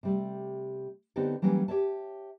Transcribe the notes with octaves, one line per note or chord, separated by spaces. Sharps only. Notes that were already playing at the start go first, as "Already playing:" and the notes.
C3 G3 A3
D3 B3 C4 D#4 G4 A4
E3 F#3 G3 A#3 C#4
G4 A4 C#5 E5 A5